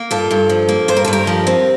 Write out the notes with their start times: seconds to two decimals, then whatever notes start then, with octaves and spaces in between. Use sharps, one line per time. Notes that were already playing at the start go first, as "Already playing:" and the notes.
Already playing: A#3
0.11 G2 F4 A4
0.31 G2
0.49 F3
0.69 A#3
0.88 G2 C5
0.97 A#4
1.05 A4
1.07 G2
1.13 G4 A#4
1.27 F3
1.47 C4